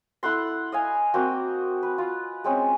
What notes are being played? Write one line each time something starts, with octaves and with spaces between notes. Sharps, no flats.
E4 A4 F#5 C6
D#5 F5 G#5
A#3 C4 F#4
B4
F4
G#3 C4 C#4